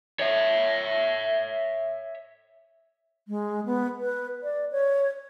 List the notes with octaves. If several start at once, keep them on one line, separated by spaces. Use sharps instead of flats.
C#5 E5
G#3
B3
B4
D5
C#5